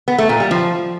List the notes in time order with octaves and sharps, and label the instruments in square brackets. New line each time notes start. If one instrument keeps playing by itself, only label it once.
[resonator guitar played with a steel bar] B3
A3
A#2
G3
F3